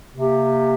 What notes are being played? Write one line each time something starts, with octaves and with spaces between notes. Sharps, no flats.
C3 A#3 G4